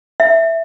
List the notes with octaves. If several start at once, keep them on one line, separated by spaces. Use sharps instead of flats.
E5